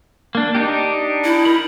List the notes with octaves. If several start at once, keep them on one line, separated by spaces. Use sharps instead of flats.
A#3 D4
D4 D#4 G4
E4
A#4 B5